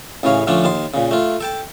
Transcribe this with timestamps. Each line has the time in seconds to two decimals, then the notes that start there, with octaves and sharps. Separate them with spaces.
0.23 A1 C#3 E3 C#5 F5
0.47 D3 F3 A3 C#4 D4
0.64 D#2 A5 C6
0.94 A#2 C#3
1.11 A3 F4
1.40 A4 G5 A5